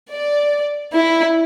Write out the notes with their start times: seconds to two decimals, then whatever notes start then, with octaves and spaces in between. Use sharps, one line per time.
0.10 D5
0.94 E4